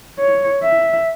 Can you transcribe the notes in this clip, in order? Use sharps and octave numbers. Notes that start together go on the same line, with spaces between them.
C#5
E5